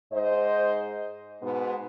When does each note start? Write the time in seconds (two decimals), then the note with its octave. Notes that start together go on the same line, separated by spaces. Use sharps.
0.12 G#2 C5 D#5
1.42 G#2 B2 B3